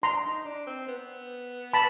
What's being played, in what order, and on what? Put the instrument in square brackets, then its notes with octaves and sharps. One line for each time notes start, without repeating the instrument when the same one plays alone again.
[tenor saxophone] D4 [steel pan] A#5 C6
[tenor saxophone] D#4
D4
C4
B3
[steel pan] A5 B5